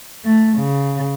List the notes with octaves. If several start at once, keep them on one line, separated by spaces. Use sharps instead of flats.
A3
C#3